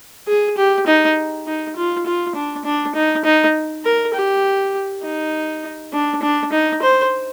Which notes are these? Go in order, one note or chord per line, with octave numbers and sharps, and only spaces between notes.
G#4
G4
D#4
D#4
F4
F4
D4
D4
D#4
D#4
A#4
G4
D#4
D4
D4
D#4
C5